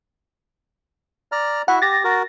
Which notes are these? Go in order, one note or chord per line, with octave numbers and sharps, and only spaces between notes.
D5 A#5 F6
E4 F#4 E5 F#5
G4 A6 A#6
F#4 A#4